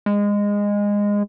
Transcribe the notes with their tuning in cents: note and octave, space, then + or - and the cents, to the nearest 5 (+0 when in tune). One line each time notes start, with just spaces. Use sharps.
G#3 -20